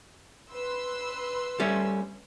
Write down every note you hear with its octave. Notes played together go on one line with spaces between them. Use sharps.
B4 C6 E6
G3 A3 C#4